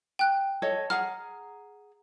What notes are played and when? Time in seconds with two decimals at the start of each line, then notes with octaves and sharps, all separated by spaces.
0.19 G5 F#6
0.62 A4 C#5 D#5
0.90 G#4 F#5 A#5 F6